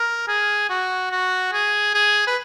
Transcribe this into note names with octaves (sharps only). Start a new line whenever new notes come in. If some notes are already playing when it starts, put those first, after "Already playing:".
Already playing: A#4
G#4
F#4
F#4
G#4
G#4
B4